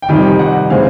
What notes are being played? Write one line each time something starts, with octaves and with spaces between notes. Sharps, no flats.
G5
F2 C3 D#3 G3 G#5
F#5
C#3 E3 G#3 C4 F5